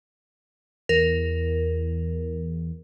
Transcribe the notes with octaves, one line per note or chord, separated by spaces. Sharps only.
E2 A#4